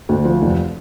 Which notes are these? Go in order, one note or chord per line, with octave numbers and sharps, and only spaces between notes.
D2
F3
F1